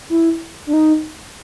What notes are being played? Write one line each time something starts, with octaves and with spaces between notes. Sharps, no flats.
E4
D4
D#4